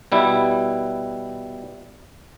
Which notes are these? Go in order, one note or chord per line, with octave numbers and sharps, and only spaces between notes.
B2 G3 E4